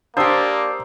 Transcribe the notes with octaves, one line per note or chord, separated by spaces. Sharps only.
A#3 D4 G4 C5 A#5 D#6 E6